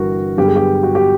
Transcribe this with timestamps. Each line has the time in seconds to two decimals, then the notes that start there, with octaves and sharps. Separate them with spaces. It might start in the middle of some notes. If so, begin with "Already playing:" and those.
Already playing: G1 G2 E3 G3 F#4 A#4
0.37 G2 D3 F#3 B3 G4
0.48 G#4
0.56 G4
0.83 F#4
0.95 G4